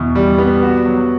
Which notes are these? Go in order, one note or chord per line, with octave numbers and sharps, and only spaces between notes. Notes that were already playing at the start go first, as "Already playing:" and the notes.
Already playing: E2 B2
G3
B3
F#4
F#3